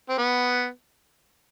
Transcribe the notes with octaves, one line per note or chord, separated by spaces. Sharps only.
C4
B3